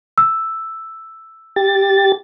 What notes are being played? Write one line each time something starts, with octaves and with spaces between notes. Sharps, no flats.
E6
G4 A6